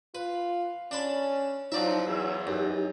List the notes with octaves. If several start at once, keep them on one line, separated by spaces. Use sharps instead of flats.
F4 B4
C#4 D4 A5 B5
F3 F#3 D#4 E4 D5 E5 A#5
E2 C#5 G#5 E6
F#2 D#4 G4